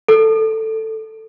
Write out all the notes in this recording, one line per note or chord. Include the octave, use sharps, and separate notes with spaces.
A4